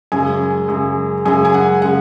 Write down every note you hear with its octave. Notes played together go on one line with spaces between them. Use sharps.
F#2 C#3 G#3 G#5
F#2 C#3 G#3
F#2 C#3 G#3 G#5
G#5
F#5
C#3 G#3 F#5